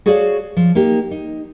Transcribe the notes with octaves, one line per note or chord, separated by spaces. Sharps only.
F#4 G#4 A4 C#5 D5 F5
F3
A#3 D#4 G4
D#4